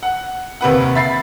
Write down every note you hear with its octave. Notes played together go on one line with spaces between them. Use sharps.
F#5
D#2 C3 B4 F#5
E5 B5 A6 C7